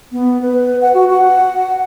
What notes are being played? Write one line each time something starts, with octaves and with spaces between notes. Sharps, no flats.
B3
B4
F#5
F#4
F#5